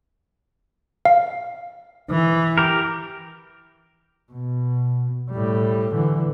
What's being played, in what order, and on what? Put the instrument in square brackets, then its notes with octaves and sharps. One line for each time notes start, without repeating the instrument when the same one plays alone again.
[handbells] F5
[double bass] E3
[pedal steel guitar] G4 A#4
[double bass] B2
A2 G3
D3 E3